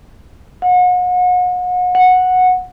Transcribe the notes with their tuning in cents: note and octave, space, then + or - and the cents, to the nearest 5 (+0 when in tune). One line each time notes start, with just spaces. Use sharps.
F#5 -35
F#5 -10